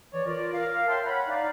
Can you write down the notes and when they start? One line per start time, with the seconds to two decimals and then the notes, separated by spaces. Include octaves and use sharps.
0.13 E3 C#5 D5
0.25 F4 A#4 D5
0.53 A#4 F5
0.88 C#5 E5 F5 G5 A5 C6
1.05 C#5 F#5 B5
1.27 D#4 D5 F5